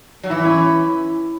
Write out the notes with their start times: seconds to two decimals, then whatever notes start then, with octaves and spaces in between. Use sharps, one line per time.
0.23 F#3
0.30 E3 E4
0.45 C#4